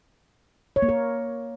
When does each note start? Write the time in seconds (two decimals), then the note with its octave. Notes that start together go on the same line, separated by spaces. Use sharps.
0.76 C#5
0.82 A#3
0.89 A#4